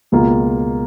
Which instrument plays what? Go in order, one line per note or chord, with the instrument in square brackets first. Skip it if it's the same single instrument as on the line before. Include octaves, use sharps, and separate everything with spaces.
[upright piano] C#2 B2 A#3 F4